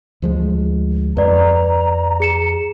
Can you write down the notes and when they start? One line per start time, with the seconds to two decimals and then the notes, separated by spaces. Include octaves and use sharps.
0.22 D2 F3 G#3
1.17 F2 B4 D5 A#5
2.20 G#4 C#7 E7